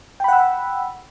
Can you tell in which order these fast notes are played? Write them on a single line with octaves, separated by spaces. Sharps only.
G5 B5 F#5 E6